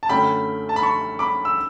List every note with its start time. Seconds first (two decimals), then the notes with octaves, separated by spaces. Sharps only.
0.03 A5
0.09 F#2 D3 A3 C#4 G5 B5
0.69 A5
0.76 B5
0.83 A5 C#6
1.19 B5 D6
1.45 E6